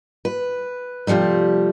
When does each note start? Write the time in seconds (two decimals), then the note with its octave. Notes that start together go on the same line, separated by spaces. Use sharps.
0.25 B4
1.07 C3 E3 F3 G3 A3